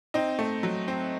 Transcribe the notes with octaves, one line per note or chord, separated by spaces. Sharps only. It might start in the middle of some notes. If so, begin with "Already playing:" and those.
C4 D#4
A3
F#3
C4